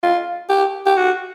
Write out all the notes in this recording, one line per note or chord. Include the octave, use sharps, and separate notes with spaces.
F4
G4
G4
F#4